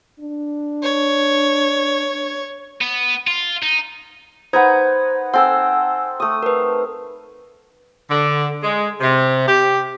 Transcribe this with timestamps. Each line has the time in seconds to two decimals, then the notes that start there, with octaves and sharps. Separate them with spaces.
0.20 D4
0.83 C#5
2.81 B3
3.27 F4
3.63 D#4
4.53 D#4 B4 C5 F#5 G#6
5.34 C4 A4 F#5 G#5 E6
6.20 A3 D#6
6.43 A#4 B4
8.10 D3
8.63 G#3
9.00 C3
9.48 G4